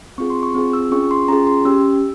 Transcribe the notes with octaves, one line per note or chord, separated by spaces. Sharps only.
C4 F4 G#4 C#6
C6
C#6
C4 F4 G#4
E6
C#4 F4 G#4 C#6
C6
C#4 F4 G#4 A#5
C6
C#4 G4 E6